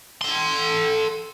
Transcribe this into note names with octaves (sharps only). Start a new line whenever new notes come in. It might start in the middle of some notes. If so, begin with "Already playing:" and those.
A4 C6